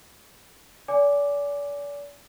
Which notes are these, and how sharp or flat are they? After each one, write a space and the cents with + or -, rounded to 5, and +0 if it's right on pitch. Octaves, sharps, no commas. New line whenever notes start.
D5 -40 G#5 +0 D6 +0